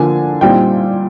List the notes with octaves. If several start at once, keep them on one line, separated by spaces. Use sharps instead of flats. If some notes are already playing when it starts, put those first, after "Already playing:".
Already playing: D3 F3 A#3 D4 G#5
A#2 G3 C4 D#4 G5